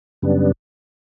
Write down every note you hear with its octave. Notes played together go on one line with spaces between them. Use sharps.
F#2 C#3 G3 B3 D4